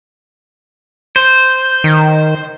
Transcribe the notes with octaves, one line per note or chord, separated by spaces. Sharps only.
C5
D#3